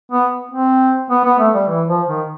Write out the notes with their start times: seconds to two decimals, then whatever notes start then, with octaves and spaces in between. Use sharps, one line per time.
0.11 B3
0.51 C4
1.10 B3
1.25 B3
1.39 A3
1.54 G3
1.68 E3
1.88 F3
2.08 D#3